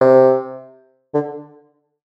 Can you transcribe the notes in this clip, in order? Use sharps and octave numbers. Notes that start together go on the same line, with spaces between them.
C3
D3